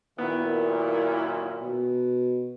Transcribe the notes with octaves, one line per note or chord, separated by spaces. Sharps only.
F#2 A#2 D#3 B3 E4
B2